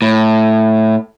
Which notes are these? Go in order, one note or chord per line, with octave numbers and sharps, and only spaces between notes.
A2